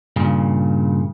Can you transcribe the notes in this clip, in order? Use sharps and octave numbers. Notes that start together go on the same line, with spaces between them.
G2 A#2 C#3